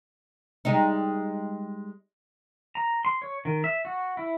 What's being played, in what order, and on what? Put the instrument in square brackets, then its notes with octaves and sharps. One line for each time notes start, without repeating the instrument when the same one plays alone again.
[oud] G3 G#3 D#4
[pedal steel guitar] A#5
C6
C#5
D#3
E5
F#4
E4